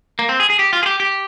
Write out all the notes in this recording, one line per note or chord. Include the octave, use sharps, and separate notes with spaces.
A#3
C4
G#4
G#4
G4
F4
G#4
G4
G4